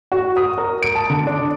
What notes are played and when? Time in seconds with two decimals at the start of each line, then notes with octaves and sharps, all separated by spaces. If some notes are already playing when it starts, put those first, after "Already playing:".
0.12 F#4
0.37 D#6
0.58 A#4
0.83 D7
0.95 A5
1.10 D3
1.27 D4